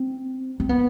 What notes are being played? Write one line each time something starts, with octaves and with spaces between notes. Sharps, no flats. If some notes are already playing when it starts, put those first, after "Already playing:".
Already playing: C4
C4
B3